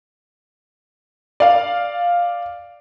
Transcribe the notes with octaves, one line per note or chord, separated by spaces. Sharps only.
D5 F5